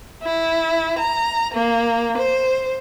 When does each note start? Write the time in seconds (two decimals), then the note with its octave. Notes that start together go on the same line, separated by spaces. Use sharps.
0.23 E4
0.99 A#5
1.54 A#3
2.18 C5